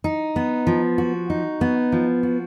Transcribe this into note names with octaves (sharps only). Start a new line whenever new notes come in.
D#4
B3
F3
F#4
D#4
B3
F3
F#4